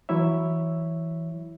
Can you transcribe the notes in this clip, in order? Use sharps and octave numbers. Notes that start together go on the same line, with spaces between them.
E3 F#3 E4 C#5 E5